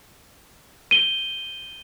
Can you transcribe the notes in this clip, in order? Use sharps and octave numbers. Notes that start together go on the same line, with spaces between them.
D#7 G7